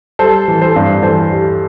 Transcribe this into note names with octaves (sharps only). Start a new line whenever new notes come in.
G3 A4 C5
E3
A4 C5
G2
E3 A4 C5
G3